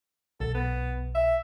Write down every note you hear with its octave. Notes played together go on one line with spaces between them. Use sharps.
B1 A4
B3
E5